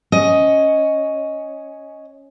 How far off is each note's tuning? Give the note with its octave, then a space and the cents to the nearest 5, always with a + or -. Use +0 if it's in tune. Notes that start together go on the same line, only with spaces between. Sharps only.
C#4 +0 D#5 +5